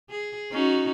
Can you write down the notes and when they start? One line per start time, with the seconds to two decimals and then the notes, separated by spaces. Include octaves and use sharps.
0.10 G#4
0.51 C#4 D#4 F#4